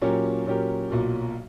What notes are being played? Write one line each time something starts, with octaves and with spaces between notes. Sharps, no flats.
A#2 F#3 C#4 G4 A#4
A#2 F#3 C#4 G4 A#4
B1 A#2 F#3